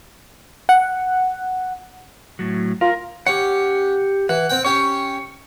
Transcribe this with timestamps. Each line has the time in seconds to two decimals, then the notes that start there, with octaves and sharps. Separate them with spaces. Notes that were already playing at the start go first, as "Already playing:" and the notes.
0.69 F#5
2.39 A2 F#3
2.81 F4 A#4
3.27 C#4 G4 F#5
4.29 E3 F#5
4.50 C4 G5
4.65 C#4 G4 C#6